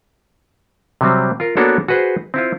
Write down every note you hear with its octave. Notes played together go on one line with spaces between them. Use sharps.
C3 F#3 G3 C4
F4 A#4
A#3 B3 D4 F#4 A4 C#5
F#4 G#4 B4 C5
C4 E4 F4